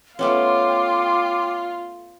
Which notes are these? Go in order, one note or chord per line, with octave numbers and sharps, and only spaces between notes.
A3 B3 C#4 F4 G5 C6 D6